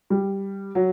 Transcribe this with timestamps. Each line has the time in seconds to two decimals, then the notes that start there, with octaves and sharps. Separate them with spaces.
0.10 G3
0.75 F#3